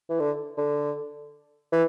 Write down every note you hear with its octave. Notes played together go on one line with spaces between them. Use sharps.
E3
D3
D3
E3